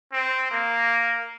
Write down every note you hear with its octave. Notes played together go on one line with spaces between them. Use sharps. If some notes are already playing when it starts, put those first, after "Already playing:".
C4
A#3